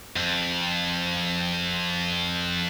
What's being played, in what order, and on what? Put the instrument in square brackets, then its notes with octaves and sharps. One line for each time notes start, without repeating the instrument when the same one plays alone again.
[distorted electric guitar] F2